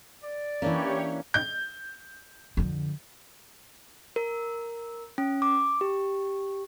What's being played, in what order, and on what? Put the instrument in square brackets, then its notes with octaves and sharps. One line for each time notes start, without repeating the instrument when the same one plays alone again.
[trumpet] D5
[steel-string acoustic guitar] E3 C#4 [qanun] A#3 D4 B4 [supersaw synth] G4 C#5
[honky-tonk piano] G6
[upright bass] F2 D3
[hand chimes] A#4
C#4
D6
G4